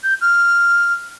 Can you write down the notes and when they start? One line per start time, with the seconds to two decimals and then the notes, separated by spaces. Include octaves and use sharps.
0.04 G6
0.21 F6